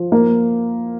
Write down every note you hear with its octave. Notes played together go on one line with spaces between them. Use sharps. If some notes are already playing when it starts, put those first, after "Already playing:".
Already playing: F3
A#3